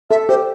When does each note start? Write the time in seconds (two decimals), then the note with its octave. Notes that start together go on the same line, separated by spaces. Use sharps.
0.10 A4 E5
0.29 G4 C5